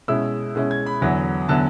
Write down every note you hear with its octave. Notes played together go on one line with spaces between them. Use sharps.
B2 G#3 C#4 E4 E6
B2 G#3 C#4 E4
G#6
B5
E2 D3 F#3 B3 E4
D3 F#3 B3 E4 A5